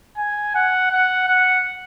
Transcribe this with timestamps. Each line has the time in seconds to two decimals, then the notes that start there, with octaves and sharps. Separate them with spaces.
0.17 G#5
0.55 F#5
0.91 F#5
1.28 F#5